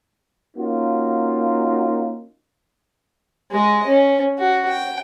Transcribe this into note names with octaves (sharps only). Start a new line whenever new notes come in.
A#3 C#4 D#4 F4 F#4
G#3 D#5
C#4
F#4
G5